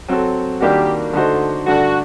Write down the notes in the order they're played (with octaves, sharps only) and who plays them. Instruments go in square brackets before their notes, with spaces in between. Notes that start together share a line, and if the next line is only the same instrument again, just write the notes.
[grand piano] F#3 C4 F#4 A4
[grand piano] D#3 G3 A#3 D4 F#4 [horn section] G4
[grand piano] D3 A3 D#4 F#4 C5
[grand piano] G2 D3 A3 [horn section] F#4